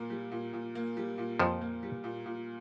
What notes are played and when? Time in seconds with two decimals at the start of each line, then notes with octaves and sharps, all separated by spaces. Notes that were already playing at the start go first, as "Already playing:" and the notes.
Already playing: A#2 A#3
0.10 G3
0.31 A#2
0.53 A#2
0.75 A#3
0.97 G3
1.18 A#2
1.40 F2 A#2 F3
1.61 A#3
1.83 G3
2.04 A#2
2.26 A#2